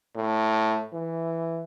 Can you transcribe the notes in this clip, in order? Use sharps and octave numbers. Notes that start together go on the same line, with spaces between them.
A2
E3